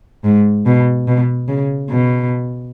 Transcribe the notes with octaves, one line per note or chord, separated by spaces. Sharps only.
G#2
B2
B2
C#3
B2